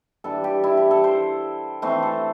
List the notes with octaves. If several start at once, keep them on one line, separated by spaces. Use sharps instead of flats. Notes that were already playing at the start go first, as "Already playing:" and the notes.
E3 G3 D4 A4
G4
E4
G4
A4
C5
E3 A3 C4 C5
A4